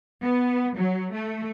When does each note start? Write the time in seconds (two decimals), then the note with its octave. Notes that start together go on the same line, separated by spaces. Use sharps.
0.23 B3
0.77 F#3
1.13 A3